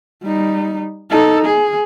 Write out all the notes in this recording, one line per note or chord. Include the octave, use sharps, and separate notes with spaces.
G3 D#4
D#4 A4
G#4